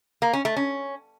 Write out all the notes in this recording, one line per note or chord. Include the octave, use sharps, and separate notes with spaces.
A#3
C#4
A3
C#4